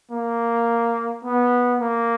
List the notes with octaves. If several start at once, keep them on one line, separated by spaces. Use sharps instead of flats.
A#3
B3
A#3